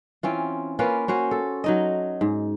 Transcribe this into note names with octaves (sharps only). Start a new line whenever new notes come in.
E3 C4 C#4 F4
A#3 C#4 F4 B4
C#4 F#4 C5
A4
F#3 D#4 D#5
G#2